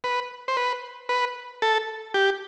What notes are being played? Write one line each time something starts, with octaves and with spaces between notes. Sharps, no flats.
B4
C5
B4
B4
A4
G4